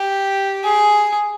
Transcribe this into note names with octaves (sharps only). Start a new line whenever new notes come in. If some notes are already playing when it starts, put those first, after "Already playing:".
Already playing: G4
G#4